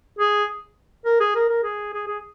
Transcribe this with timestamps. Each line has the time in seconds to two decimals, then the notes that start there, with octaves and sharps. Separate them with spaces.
0.18 G#4
1.05 A#4
1.20 G#4
1.35 A#4
1.49 A#4
1.63 G#4
1.93 G#4
2.07 G#4